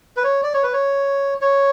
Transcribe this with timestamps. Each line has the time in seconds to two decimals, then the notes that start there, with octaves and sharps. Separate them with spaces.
0.17 B4
0.23 C#5
0.43 D5
0.54 C#5
0.63 B4
0.73 C#5
1.41 C#5